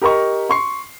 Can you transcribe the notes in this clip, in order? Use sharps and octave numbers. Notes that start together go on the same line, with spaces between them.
G4 A#4 D#5 A#5 C#6
C6 C#6 C7